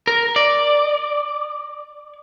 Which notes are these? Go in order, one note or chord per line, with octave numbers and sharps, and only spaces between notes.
A#4
D5